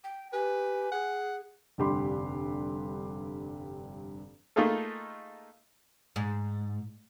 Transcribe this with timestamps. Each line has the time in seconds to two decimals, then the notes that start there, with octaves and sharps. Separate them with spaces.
0.04 G5
0.33 G4 B4 G#5
0.92 G#4 F#5
1.78 F1 G2 D3 G4 B5 C6
4.56 A3 A#3 D#4 F4 G#4 A4
6.16 G#2